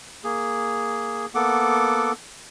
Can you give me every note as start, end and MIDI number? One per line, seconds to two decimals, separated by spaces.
0.24 1.26 58
0.24 1.26 68
1.35 2.12 58
1.35 2.12 59
1.35 2.12 69
1.35 2.12 78
1.35 2.12 86